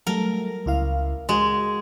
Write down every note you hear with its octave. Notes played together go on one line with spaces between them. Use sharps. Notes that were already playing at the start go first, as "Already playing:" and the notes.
F#3 G3 A3 A#4
C#2 E4 F5
G#3 F#4